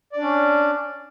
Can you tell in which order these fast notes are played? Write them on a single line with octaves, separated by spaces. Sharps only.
D5 D4 C#4